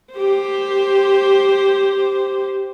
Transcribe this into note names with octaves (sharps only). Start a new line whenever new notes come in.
G4 C5